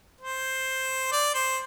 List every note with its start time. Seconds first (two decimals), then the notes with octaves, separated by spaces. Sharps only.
0.21 C5
1.12 D5
1.34 C5